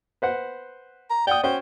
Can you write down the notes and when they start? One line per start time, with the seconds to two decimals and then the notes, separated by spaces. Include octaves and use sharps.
0.22 B4 C5 F#5
1.10 A#5
1.27 D5 F#5 G5 D#6
1.44 C#4 F#4 C5 G5